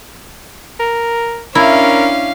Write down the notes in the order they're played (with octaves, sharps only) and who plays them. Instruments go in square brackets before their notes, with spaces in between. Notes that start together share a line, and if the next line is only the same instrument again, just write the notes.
[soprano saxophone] A#4
[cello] C#4 D4 [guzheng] E4 [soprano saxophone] A#4 [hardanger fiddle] F5